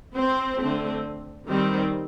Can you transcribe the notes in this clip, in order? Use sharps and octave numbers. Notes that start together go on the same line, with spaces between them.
C4 C5
D3 A3 C4
D#3 G3 C4